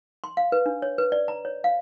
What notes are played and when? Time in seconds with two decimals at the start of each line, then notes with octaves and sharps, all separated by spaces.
0.24 C6
0.37 F5
0.52 B4
0.66 D4
0.82 C#5
0.98 B4
1.12 D5
1.28 A#5
1.45 C#5
1.64 F5